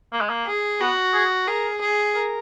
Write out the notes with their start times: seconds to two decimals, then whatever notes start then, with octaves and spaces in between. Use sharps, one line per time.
0.12 A#3
0.21 G#3
0.30 A#3
0.46 G#4
0.80 B3 F#4
1.14 G#4
1.47 G#4 A#4
1.81 G#4
2.15 A#4